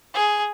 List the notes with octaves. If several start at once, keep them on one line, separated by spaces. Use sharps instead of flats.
G#4